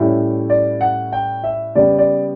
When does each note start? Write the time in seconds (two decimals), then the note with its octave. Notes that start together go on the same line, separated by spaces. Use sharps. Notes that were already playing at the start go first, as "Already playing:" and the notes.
Already playing: A2 G3 C#4 E4
0.50 D5
0.81 F#5
1.13 G5
1.44 E5
1.75 C#3 G3 B3 D5
1.99 D5